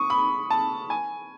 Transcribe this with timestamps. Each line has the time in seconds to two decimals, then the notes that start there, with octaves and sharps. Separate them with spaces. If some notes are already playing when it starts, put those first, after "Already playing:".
Already playing: C#6 D#6
0.10 B5
0.50 A5
0.90 G#5